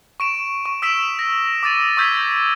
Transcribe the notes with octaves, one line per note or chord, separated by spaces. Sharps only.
C#6 D7 E7
C#6
D#6 E6 B6 D7 E7
A#6
D6 D#6 A6 D#7
C#6 D#6 E6 G6 G#6 B6